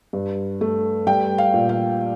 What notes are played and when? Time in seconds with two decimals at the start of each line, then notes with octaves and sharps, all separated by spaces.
0.13 G2
0.61 A3
1.07 G3 G5
1.38 F5
1.54 A#2
1.69 F5